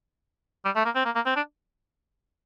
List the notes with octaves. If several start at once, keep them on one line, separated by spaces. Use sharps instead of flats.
G3
A3
A#3
C4
A#3
A#3
C4
D4